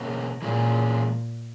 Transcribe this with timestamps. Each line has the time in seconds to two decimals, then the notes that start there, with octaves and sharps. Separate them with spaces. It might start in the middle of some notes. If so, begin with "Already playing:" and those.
Already playing: B2 A#3 C#4 G#4
0.42 A#2 E3 G#3 C#4 G#4